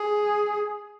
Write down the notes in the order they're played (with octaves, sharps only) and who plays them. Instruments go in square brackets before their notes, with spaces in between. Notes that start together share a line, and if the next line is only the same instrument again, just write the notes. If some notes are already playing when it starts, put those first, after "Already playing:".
Already playing: [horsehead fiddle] G#4